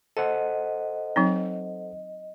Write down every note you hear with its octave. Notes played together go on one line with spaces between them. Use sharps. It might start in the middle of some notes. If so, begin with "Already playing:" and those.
A4 C5 D#5 F#5
F#3 C4 D#4